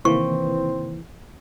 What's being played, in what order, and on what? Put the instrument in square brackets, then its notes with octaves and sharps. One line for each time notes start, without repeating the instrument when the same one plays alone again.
[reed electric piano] C3 D#3 A#3 [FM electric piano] E3 [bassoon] C4 [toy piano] C#6